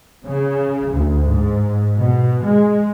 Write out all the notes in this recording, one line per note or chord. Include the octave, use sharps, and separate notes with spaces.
C#3
D2
G#2
B2
G#3